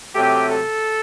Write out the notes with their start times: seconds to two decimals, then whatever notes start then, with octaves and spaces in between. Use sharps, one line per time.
0.14 C3 F#3 A3 G4
0.47 A4